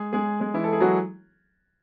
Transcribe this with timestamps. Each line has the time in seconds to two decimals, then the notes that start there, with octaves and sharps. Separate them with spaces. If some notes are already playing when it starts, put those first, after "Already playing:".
Already playing: G#3 G#4
0.13 G#3 G#4
0.40 G#3 G#4
0.54 E3 E4
0.64 A4
0.72 G#4
0.81 F#3 F#4